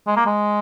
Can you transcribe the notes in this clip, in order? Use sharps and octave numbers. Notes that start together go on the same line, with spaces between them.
G#3
A#3
G#3